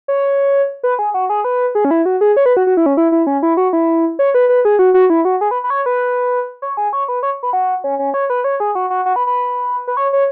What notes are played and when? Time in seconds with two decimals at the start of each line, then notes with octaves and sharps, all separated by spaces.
0.08 C#5
0.83 B4
0.99 G#4
1.14 F#4
1.30 G#4
1.44 B4
1.75 G#4
1.85 C#4
1.91 E4
2.05 F#4
2.21 G#4
2.37 C#5
2.46 B4
2.57 F#4
2.67 F#4
2.77 E4
2.86 C#4
2.97 E4
3.12 E4
3.27 C#4
3.43 E4
3.57 F#4
3.73 E4
4.19 C#5
4.34 B4
4.49 B4
4.65 G#4
4.79 F#4
4.94 F#4
5.10 E4
5.25 F#4
5.41 G#4
5.51 B4
5.64 B4
5.70 C#5
5.86 B4
6.62 C#5
6.77 G#4
6.93 C#5
7.08 B4
7.23 C#5
7.43 B4
7.53 F#4
7.84 C#4
7.99 C#4
8.14 C#5
8.30 B4
8.44 C#5
8.60 G#4
8.75 F#4
8.90 F#4
9.06 F#4
9.16 B4
9.27 B4
9.87 B4
9.97 C#5
10.13 C#5